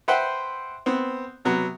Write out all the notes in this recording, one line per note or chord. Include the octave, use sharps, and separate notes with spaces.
B4 C5 E5 F#5 G5 C6
B3 C4
C3 F#3 B3